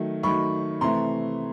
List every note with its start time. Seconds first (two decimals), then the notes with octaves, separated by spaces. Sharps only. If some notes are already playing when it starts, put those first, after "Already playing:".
Already playing: D#3 F#3 A3
0.23 D#3 F#3 A3 B5 C#6
0.81 C3 E3 A3 A#5 C6